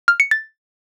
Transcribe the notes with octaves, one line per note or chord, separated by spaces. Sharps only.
F6
C#7
A6